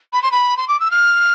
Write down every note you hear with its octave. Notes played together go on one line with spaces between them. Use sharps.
B5
C6
B5
C6
D6
E6
F6